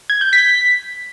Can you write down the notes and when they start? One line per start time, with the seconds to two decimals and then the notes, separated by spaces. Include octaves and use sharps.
0.10 G#6
0.21 G6
0.33 B6